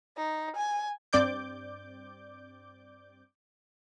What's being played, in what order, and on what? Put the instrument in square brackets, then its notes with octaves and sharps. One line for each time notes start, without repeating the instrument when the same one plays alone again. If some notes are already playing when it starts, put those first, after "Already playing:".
[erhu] D#4
G#5
[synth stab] G2 C4 D5 D6 G6